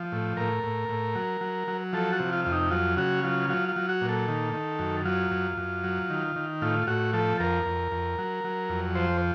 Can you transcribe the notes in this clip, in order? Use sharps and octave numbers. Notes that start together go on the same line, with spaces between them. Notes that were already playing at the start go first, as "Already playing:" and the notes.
Already playing: F3
A2
A2 A#4
A2
A2
F#3
F#3
F#3
F3 A4
F#4
C3
F4
F2 F4
D#4
F#3 F4
C#3 F#4
F#3 F4
F#3 F4
F4
F#3
F#4
A#2
A4
D#3
D#3
F#2
F#3 F4
F#2
F#2
F#3
D#3
D#3
A2 F4
A2 F#4
F3 A4
F2 A#4
F2
F2
F#3
F#3
F2
F3 C5